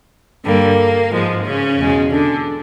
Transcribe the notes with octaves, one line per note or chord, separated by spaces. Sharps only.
G2 D3 G3 A#3
G#2 F3 G#3
C#3 C#4
E2 B2 G#3
D3 D4